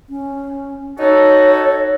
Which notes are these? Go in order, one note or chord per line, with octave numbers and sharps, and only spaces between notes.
C#4
D#4 F#4 A4 C#5